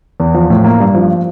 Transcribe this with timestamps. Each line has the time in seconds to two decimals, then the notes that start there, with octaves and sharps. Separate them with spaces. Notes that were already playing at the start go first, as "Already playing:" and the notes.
0.20 E2
0.34 F3
0.50 A2
0.64 A#3
0.80 G2
0.95 F3